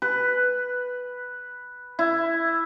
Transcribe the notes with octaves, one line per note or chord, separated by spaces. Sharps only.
B4
E4